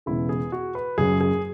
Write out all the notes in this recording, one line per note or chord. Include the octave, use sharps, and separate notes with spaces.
E1 E2 C#3 G#3 E4
G#4
F#4
B4
F#1 F#2 C#3 F#3 G#4
G#4